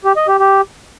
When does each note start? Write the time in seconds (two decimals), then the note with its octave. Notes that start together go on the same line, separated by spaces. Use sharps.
0.05 G4
0.16 D#5
0.28 G4
0.40 G4